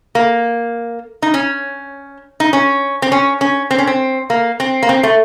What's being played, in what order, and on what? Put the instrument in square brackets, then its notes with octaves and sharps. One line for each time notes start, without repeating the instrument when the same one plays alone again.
[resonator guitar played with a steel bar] A#3
D#4
C#4
D#4
C#4
C4
C#4
C#4
C4
C#4
C4
A#3
C4
A#3
C4
A3